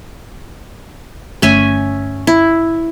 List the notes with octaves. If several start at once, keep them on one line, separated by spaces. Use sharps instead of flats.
G1 A3 C#4 E5 G#5
E4